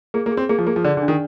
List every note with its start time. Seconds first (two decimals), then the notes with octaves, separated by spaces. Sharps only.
0.14 A#3 G#4
0.26 A#3
0.32 G#4
0.37 C4
0.49 A#3 G#4
0.58 F3
0.67 A#3 G#4
0.76 F3
0.84 D3 D5
0.97 D3
1.02 D4
1.08 D#3